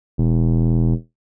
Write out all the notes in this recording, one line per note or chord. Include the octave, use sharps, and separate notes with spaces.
E1